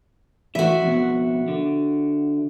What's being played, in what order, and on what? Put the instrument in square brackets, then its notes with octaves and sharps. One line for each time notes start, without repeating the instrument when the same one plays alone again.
[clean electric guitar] E3 A3 [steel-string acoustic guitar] F#4 E5
[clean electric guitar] F2 B2
D3